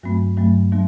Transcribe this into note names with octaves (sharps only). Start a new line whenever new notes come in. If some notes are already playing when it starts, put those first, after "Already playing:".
G2 F#3 A3 C4
G2 F#3 A3 C4
F#3 A#3 D4